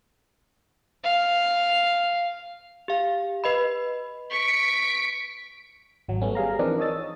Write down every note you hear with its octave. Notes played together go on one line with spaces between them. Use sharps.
F5
G4 F5
B4 D#5 B5
C#6 B6 D7
G#1 F#3
G3 A3 B3 C#4
G3 G#4 F5 A#5
E3 F3 C4 D4 D#4 A#4
C#5 D#5 D#6 E6 A6